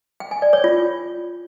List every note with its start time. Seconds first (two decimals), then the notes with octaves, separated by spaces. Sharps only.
0.20 G5
0.31 G#5
0.42 D5
0.53 C#5
0.64 F4